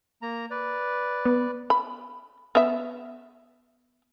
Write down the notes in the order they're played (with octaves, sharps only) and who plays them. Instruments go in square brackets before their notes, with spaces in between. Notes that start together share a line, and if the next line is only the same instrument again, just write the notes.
[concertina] A#3 A#5
B4 D5
[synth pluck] B3
[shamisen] B5
B3 E5